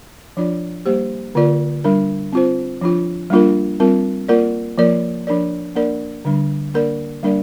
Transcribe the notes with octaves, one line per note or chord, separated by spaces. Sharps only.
F3 D4 F4 D5
G3 A#3 G4 C5
D3 A#3 F4 A#4 D5
G3 D4 A#4
C4 F4 C5
F3 D4 F4
G3 A#3 D4 F4 A#4
G3 C4 F4 A#4
A#3 F4 A#4 D5
F3 A#3 F4 A#4 D5
F3 D4 A#4 D5
A#3 D4 A#4 D5
D3 G3 D4
A#3 D4 A#4 D5
G3 A#3 D4 A#4 D5